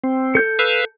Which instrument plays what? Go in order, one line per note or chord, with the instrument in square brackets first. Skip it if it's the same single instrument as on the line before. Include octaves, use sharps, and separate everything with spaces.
[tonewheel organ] C4
[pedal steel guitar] A4 G6
[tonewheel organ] B4 F5 E6